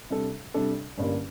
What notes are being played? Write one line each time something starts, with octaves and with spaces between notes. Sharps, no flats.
C3 G3 D4 A4
C3 G3 D4 A4
A1 G2 D3 G3 A#3